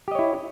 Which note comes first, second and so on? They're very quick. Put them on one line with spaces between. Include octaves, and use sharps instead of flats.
G4 D#5 C#5 E4